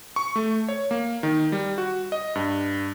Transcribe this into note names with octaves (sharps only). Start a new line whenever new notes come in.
C#6
A3
C#5
A#3
D#3
G3
F#4
D#5
G2